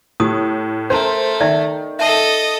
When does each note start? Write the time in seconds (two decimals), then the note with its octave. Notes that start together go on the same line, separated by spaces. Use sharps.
0.20 A2 G4 D#6
0.90 A3 C#4 A#4 C5
1.40 D#3 D#4 D5 E5
1.99 A4 D#5 E5 A5